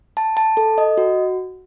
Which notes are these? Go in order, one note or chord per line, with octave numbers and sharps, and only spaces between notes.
A5
A5
A4
D#5
F#4